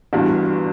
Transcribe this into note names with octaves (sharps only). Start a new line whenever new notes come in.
G1 G2 E3 F#4